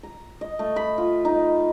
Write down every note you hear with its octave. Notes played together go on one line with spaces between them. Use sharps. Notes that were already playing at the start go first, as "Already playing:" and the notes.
A#5
D#5
A3
B5
F4
D#4